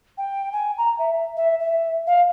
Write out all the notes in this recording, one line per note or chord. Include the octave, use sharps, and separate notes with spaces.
G5
G#5
A#5
E5
E5
E5
F5